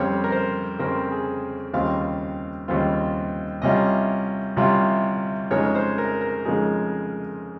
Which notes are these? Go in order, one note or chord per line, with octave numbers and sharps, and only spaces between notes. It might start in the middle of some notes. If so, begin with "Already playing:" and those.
Already playing: F2 C#3 G3 C4 C#5
A#4
C5
F2 C#3 G3 C4 A#4
G#4
D#2 C#3 G3 C4 F4 F5
D#2 C#3 G3 C4 F4
C2 C3 G3 C#4 F4 D#5
C2 C3 G3 C#4 F4
F2 C#3 F3 G#3 D#4 C#5
C5
A#4
A#4
F2 C#3 F3 G#3 D#4 G#4